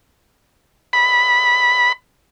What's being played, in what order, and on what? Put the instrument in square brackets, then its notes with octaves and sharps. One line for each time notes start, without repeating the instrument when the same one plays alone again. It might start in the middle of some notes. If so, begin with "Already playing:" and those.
[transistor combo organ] B5